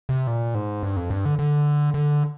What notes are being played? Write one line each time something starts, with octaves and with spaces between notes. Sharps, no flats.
C3
A#2
G#2
G2
F2
G2
D3
D3
D3